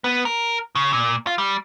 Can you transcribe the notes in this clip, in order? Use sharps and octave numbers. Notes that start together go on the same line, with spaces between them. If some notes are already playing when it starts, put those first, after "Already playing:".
B3
A#4
C#3
A#2
F4
G3